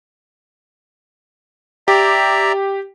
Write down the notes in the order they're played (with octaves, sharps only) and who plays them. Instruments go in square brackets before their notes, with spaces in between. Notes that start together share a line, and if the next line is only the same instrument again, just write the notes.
[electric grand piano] G4 [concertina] D5 E5 A#5